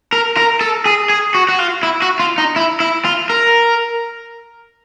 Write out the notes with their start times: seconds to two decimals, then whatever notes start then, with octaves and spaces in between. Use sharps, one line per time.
0.13 A#4
0.37 A#4
0.61 A4
0.86 G#4
1.10 G#4
1.35 F#4
1.49 F#4
1.59 F4
1.83 E4
2.02 F#4
2.20 F4
2.38 D#4
2.56 E4
2.80 E4
3.05 F4
3.30 A#4